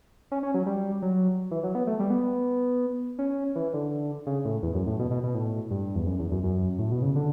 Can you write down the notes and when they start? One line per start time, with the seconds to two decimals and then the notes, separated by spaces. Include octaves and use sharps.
0.31 C#4
0.43 C#4
0.54 F#3
0.66 G3
1.02 F#3
1.51 E3
1.63 F#3
1.75 B3
1.87 A3
1.99 G3
2.10 B3
3.19 C#4
3.55 E3
3.73 D3
4.26 C#3
4.45 A2
4.63 E2
4.75 F#2
4.87 A2
4.99 B2
5.11 B2
5.23 B2
5.35 A2
5.71 G2
5.96 E2
6.07 F#2
6.19 E2
6.31 F#2
6.43 F#2
6.79 A2
6.91 B2
7.02 C#3
7.15 D3